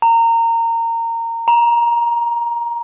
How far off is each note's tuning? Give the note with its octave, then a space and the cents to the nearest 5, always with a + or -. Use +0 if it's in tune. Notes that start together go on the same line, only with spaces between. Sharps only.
A#5 -25
A#5 +15